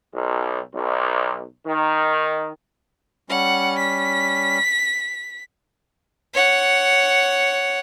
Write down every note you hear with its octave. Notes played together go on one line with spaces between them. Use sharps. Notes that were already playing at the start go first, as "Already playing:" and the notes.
B1
B1
D#3
G3 C#4 F#5
B6
C#5 F#5